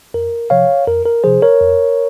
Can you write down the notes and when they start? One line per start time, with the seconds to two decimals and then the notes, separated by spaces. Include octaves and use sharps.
0.14 F2 A#4
0.50 C3 F3 C#5 F5
0.87 F2 A#4
1.05 A#4
1.24 C3 F3 G#4 C5
1.42 A#4 C#5
1.61 F2